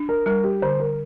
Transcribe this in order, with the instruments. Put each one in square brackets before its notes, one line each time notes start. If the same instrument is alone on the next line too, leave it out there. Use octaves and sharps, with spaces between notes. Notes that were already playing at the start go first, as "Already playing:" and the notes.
Already playing: [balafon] D4
[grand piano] A#4
[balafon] G3 [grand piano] A#4
[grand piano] G4
[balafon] D3 [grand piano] C5
[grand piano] A#4